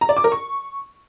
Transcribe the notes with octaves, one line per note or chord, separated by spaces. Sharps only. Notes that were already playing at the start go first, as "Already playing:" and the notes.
A#5
D5
D6
A#4
C#6